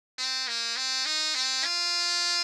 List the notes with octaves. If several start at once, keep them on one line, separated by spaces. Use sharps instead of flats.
C4
A#3
C4
D#4
C4
F4